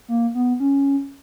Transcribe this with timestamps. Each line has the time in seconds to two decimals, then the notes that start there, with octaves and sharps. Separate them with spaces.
0.08 A#3
0.35 B3
0.60 C#4